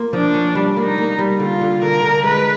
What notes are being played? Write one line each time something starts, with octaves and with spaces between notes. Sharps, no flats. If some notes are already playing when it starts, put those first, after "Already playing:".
Already playing: A#3 F4
F3 D4
C#4
G3
A#3
D#4
A#3
G3
D3 F4
D3
D3 A#4
D3
G#3 B4